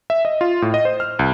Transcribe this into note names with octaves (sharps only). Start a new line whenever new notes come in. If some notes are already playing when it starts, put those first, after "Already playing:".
E5
D#5
F4
A2
D#5
C5
F6
C2